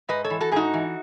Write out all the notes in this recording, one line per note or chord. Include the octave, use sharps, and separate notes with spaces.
G#2 B4 D#5
A4 C#5
E3
F#4 A4
G#2 D#4 F#4 G#4
E3